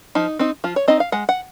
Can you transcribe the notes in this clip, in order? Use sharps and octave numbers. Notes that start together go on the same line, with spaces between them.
F3 D#4
C4 D#4
F3 F4
C#5
C4 D#4 D#5
F5
G#3 F#5
F#5